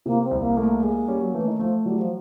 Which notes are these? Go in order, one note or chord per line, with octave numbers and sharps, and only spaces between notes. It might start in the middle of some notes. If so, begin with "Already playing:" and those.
C3 A#3
C4
C2
A#3
A3 A#3
G#3 A#3
G3 C#4
F#3
E3 A3
D#3
F3 A3
F#3 G3
F3